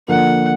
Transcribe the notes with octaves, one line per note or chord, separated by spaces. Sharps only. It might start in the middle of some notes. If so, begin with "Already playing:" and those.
D3 F3 A#3 F#5